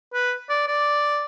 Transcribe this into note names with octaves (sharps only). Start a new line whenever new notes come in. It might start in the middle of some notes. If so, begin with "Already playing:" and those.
B4
D5
D5